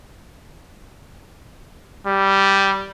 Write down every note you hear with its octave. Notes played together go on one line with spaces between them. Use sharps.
G3